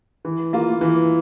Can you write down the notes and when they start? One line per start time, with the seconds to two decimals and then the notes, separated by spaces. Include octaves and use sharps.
0.25 E3
0.53 A#3 F4
0.81 E3